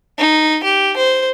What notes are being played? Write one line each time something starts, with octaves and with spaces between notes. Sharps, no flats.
D#4
G4
C5